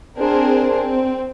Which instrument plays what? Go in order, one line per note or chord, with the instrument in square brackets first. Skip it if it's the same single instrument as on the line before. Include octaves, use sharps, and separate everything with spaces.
[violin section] C4 D4 G#4 A#4 C5
C4